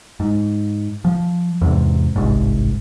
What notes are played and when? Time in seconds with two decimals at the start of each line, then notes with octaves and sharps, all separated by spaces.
0.20 G#2
1.05 F3
1.61 E2 G#2 C3
2.16 G1 C2 G#2